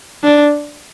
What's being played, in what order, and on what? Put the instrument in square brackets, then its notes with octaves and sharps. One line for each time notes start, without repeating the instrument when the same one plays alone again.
[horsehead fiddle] D4